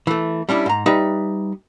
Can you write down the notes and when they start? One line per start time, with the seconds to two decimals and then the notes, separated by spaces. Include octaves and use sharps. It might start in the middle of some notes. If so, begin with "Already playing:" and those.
0.07 E3 A3
0.49 G3 C#4 D4 E4
0.66 G#2 A#5
0.86 G3 D#4 B4 E5